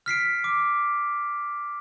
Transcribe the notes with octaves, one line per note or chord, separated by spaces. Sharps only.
F6 B6 C7 D7
D6